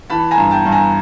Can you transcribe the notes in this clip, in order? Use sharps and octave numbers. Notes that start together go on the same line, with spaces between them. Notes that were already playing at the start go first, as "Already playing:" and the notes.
E3 A5 B5
G#5 A#5
G2
G5 A5
G2
G#5 A#5